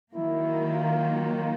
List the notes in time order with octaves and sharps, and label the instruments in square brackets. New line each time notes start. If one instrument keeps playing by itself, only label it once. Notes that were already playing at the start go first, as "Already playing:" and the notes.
[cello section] D#3 F#3 A#3 [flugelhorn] E4
[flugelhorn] F4